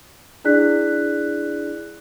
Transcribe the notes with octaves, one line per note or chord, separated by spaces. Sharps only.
D4 E4 G#4 D5 F#6 B6